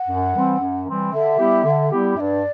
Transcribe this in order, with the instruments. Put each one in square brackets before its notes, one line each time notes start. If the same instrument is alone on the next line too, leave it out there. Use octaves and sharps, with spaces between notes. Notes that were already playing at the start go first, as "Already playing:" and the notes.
Already playing: [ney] F#5
[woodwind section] F#2
E3 G3 C4
F#2
E3 G3 C4
[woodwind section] D3 [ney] E5
[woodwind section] G3 B3 E4 G4
D3
G3 B3 E4 G4
[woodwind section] G2 [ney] D5 E5